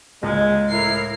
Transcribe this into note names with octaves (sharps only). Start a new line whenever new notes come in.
C#2 G#3
A2 E4 A#4 A#5 C7